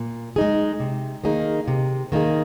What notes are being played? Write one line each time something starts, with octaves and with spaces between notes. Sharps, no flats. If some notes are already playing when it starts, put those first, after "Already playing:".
Already playing: A#2
G#3 D#4 G#4
C3
D#3 A#3 D#4 G#4
C3
D#3 A#3 D#4 G#4